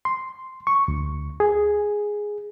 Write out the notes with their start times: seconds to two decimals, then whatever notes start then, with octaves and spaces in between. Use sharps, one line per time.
0.05 C6
0.67 C#6
0.88 D2
1.40 G#4